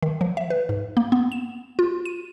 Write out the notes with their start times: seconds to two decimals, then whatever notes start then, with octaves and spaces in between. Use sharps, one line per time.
0.03 D#3
0.21 F3
0.37 E5
0.50 B4
0.69 G#2
0.97 A#3
1.12 B3
1.32 E7
1.79 F4
2.05 D#7